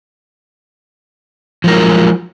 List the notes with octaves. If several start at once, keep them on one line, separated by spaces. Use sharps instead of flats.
F3 F#3 G#3 A#4